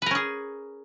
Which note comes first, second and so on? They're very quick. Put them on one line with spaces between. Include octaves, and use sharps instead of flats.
B4 A#4 C#4 G#4